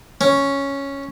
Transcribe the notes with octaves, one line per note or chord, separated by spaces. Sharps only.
C#4